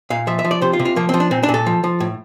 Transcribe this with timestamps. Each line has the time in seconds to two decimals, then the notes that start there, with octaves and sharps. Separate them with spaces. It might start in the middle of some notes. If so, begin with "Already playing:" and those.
0.10 A#2 F5
0.27 F3 E5
0.39 E5
0.45 F3
0.51 D5
0.62 C3 C5
0.73 F4
0.79 C3
0.85 F4
0.96 F3 A#3
1.09 C4
1.14 F3
1.20 D4
1.31 A#2 C4
1.43 D4
1.49 A#2
1.54 A4
1.66 F3
1.84 F3
2.00 A2